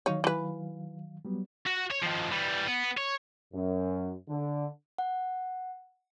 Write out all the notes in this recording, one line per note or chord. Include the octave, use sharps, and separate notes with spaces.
D#3 F#3 D#4 C#5 F5
E3 B4
F#3 G3 B3
F#4
C#5
D#3 F3
E3 G3
B3
C#5
F#2
D3
F#5